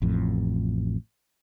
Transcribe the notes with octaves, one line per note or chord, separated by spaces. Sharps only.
A1 F2 A2